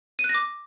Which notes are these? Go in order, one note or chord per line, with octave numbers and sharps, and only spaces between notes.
D#7
F#6
A#6
D6